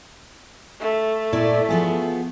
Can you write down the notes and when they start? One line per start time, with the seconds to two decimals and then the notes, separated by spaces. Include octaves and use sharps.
0.80 A3
1.33 A#2 E4 D5
1.69 F3 B3 G#4